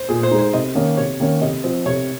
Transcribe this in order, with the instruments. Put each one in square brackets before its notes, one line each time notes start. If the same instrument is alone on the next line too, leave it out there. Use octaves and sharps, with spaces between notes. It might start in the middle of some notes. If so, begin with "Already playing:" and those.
Already playing: [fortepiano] C5
[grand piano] A#2 [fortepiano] G#4
[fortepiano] C5
[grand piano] G#3 D#4
[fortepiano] C5
[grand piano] C3 [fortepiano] D#5
[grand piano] D#3 A#3 C#4
[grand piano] C3 [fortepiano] C#5
[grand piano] D#3 A#3 C#4
[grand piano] C3 [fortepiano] D#5
[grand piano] F3 C4
[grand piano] C3 [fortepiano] C#5